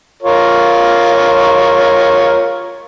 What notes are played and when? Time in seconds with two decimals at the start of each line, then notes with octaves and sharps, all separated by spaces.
0.22 F4 A#4 C#5